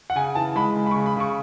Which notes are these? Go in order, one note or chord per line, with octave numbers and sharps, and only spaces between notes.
F#5
C#3 G#5
E3 A5
G#3 B5
C#3
B5
C#6
C#3
B5
C#3 C#6